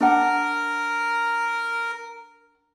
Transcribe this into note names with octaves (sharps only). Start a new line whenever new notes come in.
D4 A#4 F#5